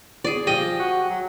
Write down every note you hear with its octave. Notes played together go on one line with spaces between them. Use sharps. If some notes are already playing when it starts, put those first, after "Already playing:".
G#4 D5
F3 G4 D#5
F#4
F#3